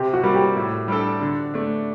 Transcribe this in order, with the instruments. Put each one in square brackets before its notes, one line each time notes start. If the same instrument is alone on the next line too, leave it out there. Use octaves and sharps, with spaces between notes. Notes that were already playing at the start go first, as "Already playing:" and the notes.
Already playing: [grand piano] C3 [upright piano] G4
[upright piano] F#4
[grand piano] G3 A#3
[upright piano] G4
[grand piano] A2
G3 D4 A4
D3
A3 D4